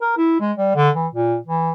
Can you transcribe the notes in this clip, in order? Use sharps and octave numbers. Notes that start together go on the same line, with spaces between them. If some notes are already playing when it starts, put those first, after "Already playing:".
A#4
E4
G#3
G3
D3
E3
A#2
E3